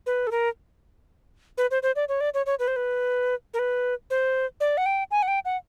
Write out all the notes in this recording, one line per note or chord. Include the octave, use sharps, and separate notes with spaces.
B4
A4
A#4
B4
C5
C5
D5
C#5
D5
C#5
C#5
B4
C5
B4
A#4
B4
C5
D5
F#5
G5
G#5
F#5
G5
F#5